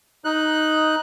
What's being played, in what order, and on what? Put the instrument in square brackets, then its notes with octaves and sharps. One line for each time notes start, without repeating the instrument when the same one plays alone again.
[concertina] D#4 F#6